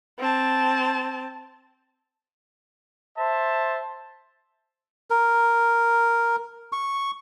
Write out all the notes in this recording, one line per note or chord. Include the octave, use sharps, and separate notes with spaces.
C4 A5
C5 E5 A5
A#4
C#6